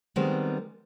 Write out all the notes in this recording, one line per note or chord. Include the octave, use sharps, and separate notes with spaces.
D#3 G3 G#3 B3 C4 A#4